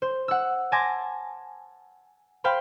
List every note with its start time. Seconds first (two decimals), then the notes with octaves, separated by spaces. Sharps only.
0.02 C5
0.28 F#5 E6
0.72 G#5 A5 C6 D6 G#6 A#6
2.44 C5 F5 G5 B5